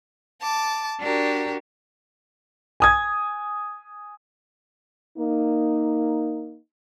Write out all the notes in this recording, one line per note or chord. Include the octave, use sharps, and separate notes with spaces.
A5 D6
D4 F#4 G4 A#4
G#5 D#6 G#6
A#3 D#4